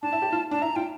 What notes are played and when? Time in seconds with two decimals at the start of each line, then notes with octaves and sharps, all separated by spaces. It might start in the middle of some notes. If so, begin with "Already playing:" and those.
0.03 D4 A5
0.13 E4
0.22 G4
0.32 F4
0.51 D4 A5
0.62 E4 A#5
0.76 F4 G5